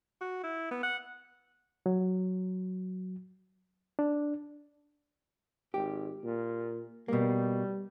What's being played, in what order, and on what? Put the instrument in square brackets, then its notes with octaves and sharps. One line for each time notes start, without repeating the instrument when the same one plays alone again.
[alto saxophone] F#4
E4
B3
F#5
[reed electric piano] F#3
D4
[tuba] G#1 [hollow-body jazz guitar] G4
[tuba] A#2
[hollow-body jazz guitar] B2 A#3 [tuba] G3